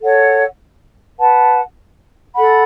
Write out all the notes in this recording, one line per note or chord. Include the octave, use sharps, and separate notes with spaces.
A4 C#5 F#5
B4 F#5 A5
A4 F#5 B5